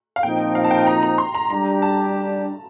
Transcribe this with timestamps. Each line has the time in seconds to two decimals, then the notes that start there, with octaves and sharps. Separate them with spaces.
0.16 F5
0.23 A#2 F3 C4 D#4 G5
0.55 F5
0.64 A5
0.71 G5
0.87 A#5
1.03 A#5
1.18 C6
1.35 A#5
1.50 G3 D4 G4 A#5
1.82 A5